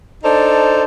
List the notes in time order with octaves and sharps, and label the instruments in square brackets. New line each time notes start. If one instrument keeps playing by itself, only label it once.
[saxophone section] D4 D#4 A4 C5